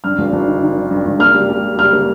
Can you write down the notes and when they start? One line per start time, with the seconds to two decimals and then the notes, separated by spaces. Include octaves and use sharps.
0.04 G2 F6
0.19 G#1
0.33 G#1
0.48 D#3
0.62 D#3
0.77 G2
0.90 G2
1.06 G#1
1.20 A#3 F6
1.35 G3
1.49 G3
1.64 G3
1.78 G3 F6
1.93 A#3